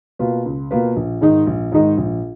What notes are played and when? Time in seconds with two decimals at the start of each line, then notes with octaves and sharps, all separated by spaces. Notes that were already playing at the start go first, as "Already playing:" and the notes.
0.19 B2 A#3 F4 B4
0.45 C#2
0.71 B2 A#3 F4 B4
0.96 A#1
1.21 G#2 D#3 G#3 D#4
1.47 A#1
1.72 G#2 D#3 G#3 D#4
1.97 A#1